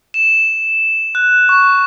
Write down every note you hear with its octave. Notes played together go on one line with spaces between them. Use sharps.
E7
F#6
C#6